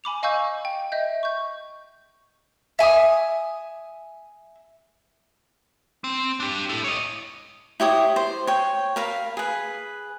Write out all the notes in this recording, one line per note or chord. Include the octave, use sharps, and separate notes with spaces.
G#5 B5 D6 F7
D#5 F5 G#5 C#6 E6 G6
G5
D#5 E5 G6
C#6 G6
E5 G#5 D6 D#6
C4
D4 G4
E4 A4
C#5 D#5
E4 G4 C#5 D#6
C5
C#5 G5
A#4 F5 B5
G#4 B4